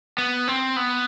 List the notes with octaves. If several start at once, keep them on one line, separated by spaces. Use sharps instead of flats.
B3
C4
B3